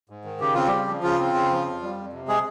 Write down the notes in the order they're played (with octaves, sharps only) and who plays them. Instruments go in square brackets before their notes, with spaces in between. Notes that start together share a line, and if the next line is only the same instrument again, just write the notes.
[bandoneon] G#2
D#3
C#3 G4
C4 F4
C#3 G3 G4
F3
C#3 F4
C4
C#3
F3
F2
G3
F2
C3
G#3 G#4